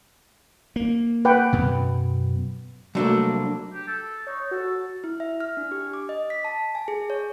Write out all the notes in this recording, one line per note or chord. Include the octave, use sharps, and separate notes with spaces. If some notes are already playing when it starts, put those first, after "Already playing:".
A#3
B4 F#5 G5
F#2 B2
C2 F#3 A3 A#3 D4
G4
A4
D#4 C#5
F#4 A4
E4
E5
F6
D4
G4
D6
D#5
B6
A5
G#5
G#4
C#5